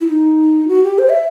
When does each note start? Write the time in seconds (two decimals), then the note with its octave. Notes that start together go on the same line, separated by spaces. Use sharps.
0.01 E4
0.08 D#4
0.68 F#4
0.83 G4
0.99 C5
1.09 E5